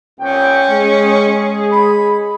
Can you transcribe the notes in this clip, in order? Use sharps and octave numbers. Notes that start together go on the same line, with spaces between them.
C2 A#2 C#4 G5
G#3 G#4
B5